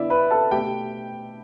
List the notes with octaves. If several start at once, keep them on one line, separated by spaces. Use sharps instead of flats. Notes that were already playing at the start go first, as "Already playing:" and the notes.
Already playing: D3 B3 E4 D5 E5
B4 B5
A4 A5
B2 A3 G4 G5